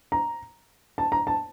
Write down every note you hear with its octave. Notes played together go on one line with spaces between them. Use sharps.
A#5
A5
A#5
A5